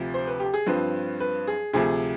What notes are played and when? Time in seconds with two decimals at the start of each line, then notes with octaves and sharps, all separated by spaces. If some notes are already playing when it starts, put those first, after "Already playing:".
Already playing: D2 C3 F3
0.14 C5
0.27 B4
0.40 G4
0.54 G#4
0.66 G2 F3 C4 B4
1.20 B4
1.47 G#4
1.73 D2 C3 F3 G#4